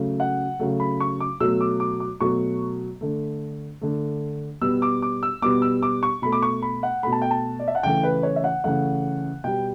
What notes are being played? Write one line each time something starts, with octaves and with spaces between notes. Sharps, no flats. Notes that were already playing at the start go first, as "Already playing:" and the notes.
Already playing: C#3 F#3 A3
F#5
C#3 F#3 A3
B5
C#6
D6
B2 F#3 A3 E6
D6
D6
D6
B2 F#3 A3 C#6
D3 A3
D3 A3
B2 G3 B3 E6
D6
D6
E6
B2 G3 B3 D6
E6
D6
C#6
B2 A3 B5
D6
C#6
B5
F#5
B2 A3 B5
A5
G5
A5
D5
E5
F#5
C#3 E3 A3 G5
B4
C#5
E5
F#5
C#3 E3 A3 F#5
B2 G3 B3 G5